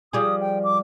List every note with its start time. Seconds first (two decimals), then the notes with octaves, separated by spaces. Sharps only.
0.13 F3 G3 G#4 D#6
0.40 G5
0.64 D6